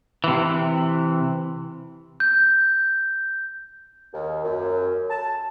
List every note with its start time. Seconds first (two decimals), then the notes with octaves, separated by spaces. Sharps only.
0.24 C3 E3
2.20 G6
4.13 D#2
4.44 F#2
5.10 A5